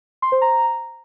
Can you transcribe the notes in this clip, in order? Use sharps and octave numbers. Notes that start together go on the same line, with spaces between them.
C6
C5
A#5